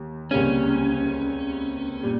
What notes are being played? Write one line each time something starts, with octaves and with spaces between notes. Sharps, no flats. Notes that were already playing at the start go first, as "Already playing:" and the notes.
Already playing: D#2
C#2 C3 G3 A#3 C#4
A#2 G3